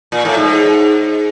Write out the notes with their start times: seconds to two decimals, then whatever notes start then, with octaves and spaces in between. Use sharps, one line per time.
0.12 A#2
0.25 A2
0.37 G#2